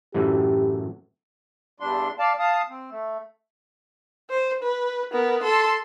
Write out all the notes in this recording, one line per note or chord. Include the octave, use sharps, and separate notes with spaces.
F#2 A2 E3 G4
E2 G2 G3 D4 C6
D5 F5 A5
F5 A5 D#6
C4
A3
C5
B4
B3 A#4
A4 C6